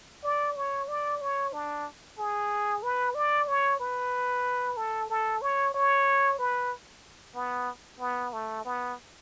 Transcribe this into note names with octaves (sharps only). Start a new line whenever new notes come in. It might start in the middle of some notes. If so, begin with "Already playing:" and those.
D5
C#5
D5
C#5
D4
G#4
B4
D5
C#5
B4
A4
A4
C#5
C#5
B4
B3
B3
A3
B3